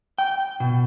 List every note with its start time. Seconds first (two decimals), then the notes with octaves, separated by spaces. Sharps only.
0.18 G5
0.60 B2